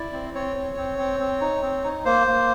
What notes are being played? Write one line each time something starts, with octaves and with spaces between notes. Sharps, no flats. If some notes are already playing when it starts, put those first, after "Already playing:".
Already playing: E4 D5
C4
C4 C#5
C4
C4
C4
C4
D#4
C4
D#4
A#3 C5
A#3